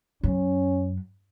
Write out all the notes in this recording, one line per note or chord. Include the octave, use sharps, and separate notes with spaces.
F#2 C#4